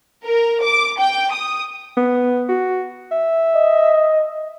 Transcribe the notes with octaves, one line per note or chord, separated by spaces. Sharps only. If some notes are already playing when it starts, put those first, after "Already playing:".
A#4
D6
G5
D#6
B3
F#4
E5
D#5